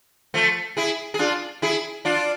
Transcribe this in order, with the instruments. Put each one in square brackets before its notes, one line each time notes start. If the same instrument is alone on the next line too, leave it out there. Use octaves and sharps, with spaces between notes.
[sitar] F3 A3
E4 G#4
G#4
D4 F4
E4 G#4
D4 F4